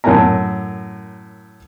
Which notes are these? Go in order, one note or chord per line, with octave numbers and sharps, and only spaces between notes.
F#2 A2 A#4 G#5 A#5